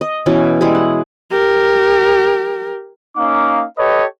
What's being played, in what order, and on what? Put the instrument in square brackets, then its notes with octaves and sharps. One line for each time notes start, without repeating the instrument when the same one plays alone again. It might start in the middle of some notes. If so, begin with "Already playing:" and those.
[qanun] D#5
B2 E3 C#4 E4
G3 G#3 E4 G#4
F#5
[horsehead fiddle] G4 A#4
[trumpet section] A#3 C#4 D#4 F5 D6
G4 A4 B4 C#5 D#5